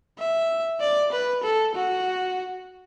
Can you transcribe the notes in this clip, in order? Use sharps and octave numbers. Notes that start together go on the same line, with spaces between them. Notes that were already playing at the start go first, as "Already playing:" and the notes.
E5
D5
B4
A4
F#4